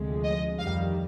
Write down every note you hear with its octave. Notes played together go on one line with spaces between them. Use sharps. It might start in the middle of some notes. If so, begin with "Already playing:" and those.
Already playing: D2 C3 F3 G#3
D#5
F2 D#3 G3 F5